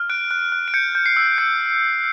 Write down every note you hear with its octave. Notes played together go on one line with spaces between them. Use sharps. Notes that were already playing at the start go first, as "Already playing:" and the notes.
Already playing: F6
F#6 D7
F#6
F#6
D7
G6 C#7
G6
C7
E6
G6 D7